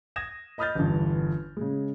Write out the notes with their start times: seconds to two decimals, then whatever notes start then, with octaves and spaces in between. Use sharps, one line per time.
0.16 D#6 G#6 A#6 E7
0.58 D#5 B5 D#6 F6 G6 A6
0.75 G1 E2 G2
1.57 C#3 G#3